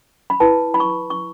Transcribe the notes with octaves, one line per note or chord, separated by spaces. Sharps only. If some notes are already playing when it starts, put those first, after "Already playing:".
B5
E4 B4 A5
B5
C#6
C#6